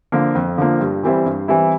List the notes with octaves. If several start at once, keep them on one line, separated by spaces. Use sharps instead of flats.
D3 F3 A#3
F2
D3 F3 A#3
G2
E3 G3 C4 E4
G2
E3 G3 C4 E4